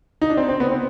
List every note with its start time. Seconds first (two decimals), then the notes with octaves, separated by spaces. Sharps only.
0.22 D#4
0.30 D4
0.37 C4
0.49 C4
0.60 B3
0.71 C4